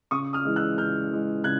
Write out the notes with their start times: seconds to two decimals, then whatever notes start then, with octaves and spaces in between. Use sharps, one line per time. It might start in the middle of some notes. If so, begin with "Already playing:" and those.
0.11 C#3 C#6 D#6
0.33 D#6 F6
0.45 E3 G#3
0.56 E6 F#6
0.78 C#3 F6 G6
1.10 E3 G#3
1.44 C#3 F#6 G#6